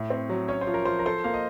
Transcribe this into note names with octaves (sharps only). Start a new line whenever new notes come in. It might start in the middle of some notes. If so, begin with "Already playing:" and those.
Already playing: A2
C4
F#3
C#4 C#5
C5
F3
A#4
F3 C5
A#4
A4 C5
A#3 F5
D#5